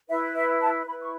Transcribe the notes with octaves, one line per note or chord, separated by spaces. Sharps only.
E4 B4 E5
E5
A5
E4 B4 B5
C#6